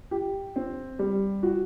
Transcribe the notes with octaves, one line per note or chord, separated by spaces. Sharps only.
G4
C4
G3
F#4